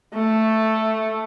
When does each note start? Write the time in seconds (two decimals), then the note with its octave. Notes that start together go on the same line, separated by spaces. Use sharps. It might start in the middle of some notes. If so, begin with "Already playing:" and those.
0.15 A3